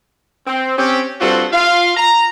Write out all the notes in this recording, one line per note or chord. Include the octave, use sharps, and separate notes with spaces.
C4
C4 C#4 G4
G2 G3 C4 F4 F#4 A4
F4 F5
A#5